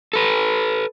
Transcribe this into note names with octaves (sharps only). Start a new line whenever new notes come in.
A4 B4